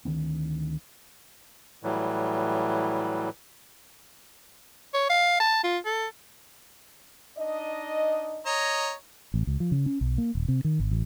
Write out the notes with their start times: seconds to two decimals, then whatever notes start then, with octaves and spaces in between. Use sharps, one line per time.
0.05 D2 D#3 B3 C4
1.83 A2 E3 F#3 G3
4.94 C#5
5.10 F5
5.40 A5
5.64 F4
5.86 A4
7.37 D4 D#4 D#5
8.46 C#5 D#5 A#5
9.34 A1
9.47 C#2
9.60 F3
9.72 C#3
9.86 C#4
10.01 B1
10.18 A#3
10.35 D#1
10.48 C3
10.64 D#3
10.80 G#1
10.91 A1